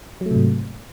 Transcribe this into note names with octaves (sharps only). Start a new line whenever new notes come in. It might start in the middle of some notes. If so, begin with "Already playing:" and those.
G#2 C3 F#3 A3